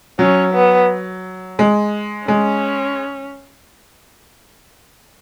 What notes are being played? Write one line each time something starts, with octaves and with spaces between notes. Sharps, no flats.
F#3 C#4
B3
G#3
G#3 C#4